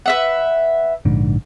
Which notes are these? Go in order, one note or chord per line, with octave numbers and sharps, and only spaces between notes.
B4 E5 F#5
A#1 G#2 D3